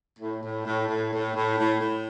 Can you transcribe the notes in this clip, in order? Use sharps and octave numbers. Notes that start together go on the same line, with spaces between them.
A2
A2
A2
A2
A2
A2
A2
A2